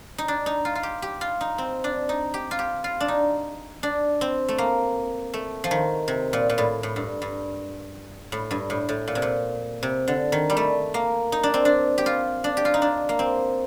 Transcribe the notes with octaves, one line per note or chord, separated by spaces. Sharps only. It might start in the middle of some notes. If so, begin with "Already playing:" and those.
D#4
D4
D#4
F4
F4
G4
G4
F4
D#4
C4
D4
D#4
G4
F4
G4
F4
D4
D#4
D4
C4
A3
A#3
A3
F3
D#3
C3
A#2
A#2
A2
A2
G2
G2
A2
G2
A2
A2
A#2
C3
A#2
C3
D3
D#3
G3
A3
A#3
D#4
D4
C4
D4
G4
F4
D4
G4
F4
D#4
D4
A#3
C4